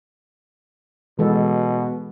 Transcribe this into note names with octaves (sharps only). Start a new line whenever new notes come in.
B2 E3 G#3 A4